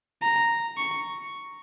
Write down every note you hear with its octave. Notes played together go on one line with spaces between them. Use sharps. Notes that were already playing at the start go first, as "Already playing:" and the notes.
A#5
C#6